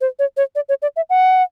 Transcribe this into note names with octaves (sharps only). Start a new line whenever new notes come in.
C5
C#5
C#5
D5
C#5
D5
E5
F#5